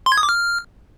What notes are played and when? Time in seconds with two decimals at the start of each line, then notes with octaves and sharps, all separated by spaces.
0.06 C6
0.12 G#6
0.18 D#6
0.23 D6
0.29 F6